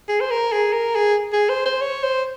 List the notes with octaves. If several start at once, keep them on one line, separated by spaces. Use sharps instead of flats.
G#4
C5
A#4
G#4
A#4
G#4
G#4
C5
C5
C#5
C5